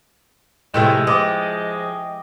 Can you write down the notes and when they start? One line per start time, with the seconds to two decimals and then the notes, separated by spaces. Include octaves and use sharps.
0.74 A2 C3 F3 G#3 E5 G5
1.07 F3 D#5 D6